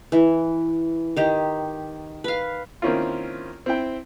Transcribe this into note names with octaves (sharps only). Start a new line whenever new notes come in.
E3
D#3 G4 A#5
B4 F5
D#3 A#3 C4 C#4 E4 F4
C4 E4 G5